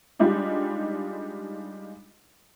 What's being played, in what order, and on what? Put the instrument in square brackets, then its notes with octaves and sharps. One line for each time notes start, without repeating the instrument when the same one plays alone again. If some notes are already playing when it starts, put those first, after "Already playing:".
[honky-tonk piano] G3 G#3 D4 D#4 F4